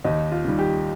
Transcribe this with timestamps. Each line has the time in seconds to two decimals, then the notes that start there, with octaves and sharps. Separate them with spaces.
0.04 D#2 D#4
0.32 F4
0.45 D#3 G3
0.59 G4